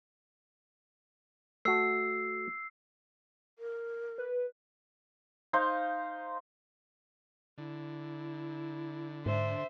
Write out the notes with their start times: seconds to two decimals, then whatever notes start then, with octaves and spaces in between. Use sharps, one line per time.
1.65 A3 F#4 E6 C7
3.59 A#4
4.18 B4
5.53 D#4 C5 F5
7.58 D3 E4
9.26 G#2 D4 C5 E5